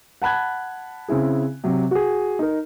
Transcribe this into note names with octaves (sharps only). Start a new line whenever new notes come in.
F#5 A5 B5 F#6 G#6
C#3 C4 E4 G#4
C3 F#3
F#4 G#4
D#4 A#4